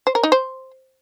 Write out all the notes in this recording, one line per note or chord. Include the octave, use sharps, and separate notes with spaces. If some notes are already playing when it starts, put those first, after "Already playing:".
C5
A#4
D#4
C5